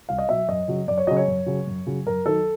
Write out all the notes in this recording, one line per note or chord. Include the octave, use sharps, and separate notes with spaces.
C2 F5
D#5
B2 F#3 E5
F#2 D#5
C#3 F#3
F#2 D5
C#5
C#3 F#3 D#5
C#5
F#2
C#3 F#3
F#2
C#3 F#3
F#2 A#4
D#3 F#3 A4